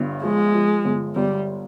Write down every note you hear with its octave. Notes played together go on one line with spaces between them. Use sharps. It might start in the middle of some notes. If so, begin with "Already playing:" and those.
Already playing: G1 G2
F3 G#3
F3
G1
G1 G3